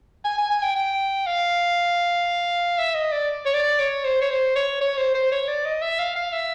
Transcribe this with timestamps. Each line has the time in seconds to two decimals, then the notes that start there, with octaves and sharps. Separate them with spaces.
0.24 G#5
0.38 G#5
0.50 G#5
0.63 G5
0.76 G5
1.26 F5
2.78 E5
2.95 D#5
3.12 D5
3.46 C#5
3.54 D5
3.79 C#5
4.05 C5
4.21 C#5
4.30 C5
4.55 C#5
4.81 C#5
4.97 C5
5.14 C5
5.31 C#5
5.48 D5
5.65 D#5
5.82 E5
5.99 F5
6.16 F5
6.33 E5